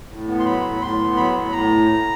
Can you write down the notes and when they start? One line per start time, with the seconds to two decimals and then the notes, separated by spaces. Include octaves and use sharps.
0.09 A2
0.28 B3
0.40 C6
0.46 F#3 B5
0.63 A2
0.81 A2 C6
0.99 B3
1.16 F#3 B5
1.34 A2
1.52 A2 A#5